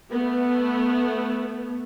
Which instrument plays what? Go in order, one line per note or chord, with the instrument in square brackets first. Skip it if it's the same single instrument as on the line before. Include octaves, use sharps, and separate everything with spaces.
[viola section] A3 B3